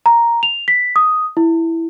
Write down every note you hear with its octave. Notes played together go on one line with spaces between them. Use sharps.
A#5
F7
B6
D#6
E4